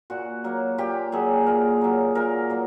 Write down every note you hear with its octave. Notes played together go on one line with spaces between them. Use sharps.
A#2 F#4
F#3 A#3
A#2 G4
F#3 A#3 G#4
A#2 A#4
F#3 A#3
A#2 A#4
F#3 A#3